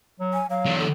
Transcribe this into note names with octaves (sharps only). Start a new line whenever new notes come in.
F#3
G#5
F#3 F5
E2 D3
A4